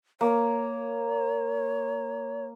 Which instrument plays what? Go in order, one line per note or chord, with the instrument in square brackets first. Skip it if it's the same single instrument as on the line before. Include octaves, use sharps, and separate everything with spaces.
[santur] A#3 [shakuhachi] C#5